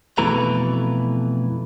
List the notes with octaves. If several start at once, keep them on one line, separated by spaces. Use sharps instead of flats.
F2 B2 E3 A3 B4 A#5